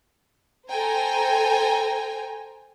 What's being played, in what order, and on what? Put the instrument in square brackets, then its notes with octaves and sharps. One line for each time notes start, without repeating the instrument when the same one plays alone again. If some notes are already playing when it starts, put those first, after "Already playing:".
[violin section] A4 C5 G5 G#5 A#5